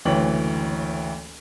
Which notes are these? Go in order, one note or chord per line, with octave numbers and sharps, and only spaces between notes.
F#1 D2 E3 C#5 G5 F#7